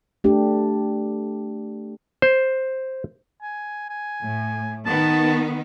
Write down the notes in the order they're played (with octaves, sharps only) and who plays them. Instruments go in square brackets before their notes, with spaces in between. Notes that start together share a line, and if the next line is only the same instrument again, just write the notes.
[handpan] A3 D4 G4
[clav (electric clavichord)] C5
[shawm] G#5
G#5
[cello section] A2
[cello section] D#3 B3 [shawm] A5